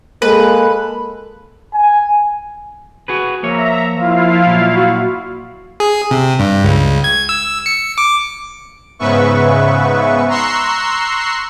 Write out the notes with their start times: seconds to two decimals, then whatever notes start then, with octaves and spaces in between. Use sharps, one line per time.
0.22 G#3 A#3 A4 B4
1.74 G#5
3.08 F#4 G#4 B4
3.43 F3 A#3 C#5 E5 A#5
3.97 F3 E4 F4 F5
4.46 A#2 F#3
4.76 F#4
5.80 G#4
6.11 C3
6.39 G2
6.64 C#2
7.04 G#6
7.29 E6
7.66 C#7
7.98 D6
8.99 G#2 C#3 B3 B4 E5 C#6
10.29 A#5 C6 C#6 E6 F#6 C7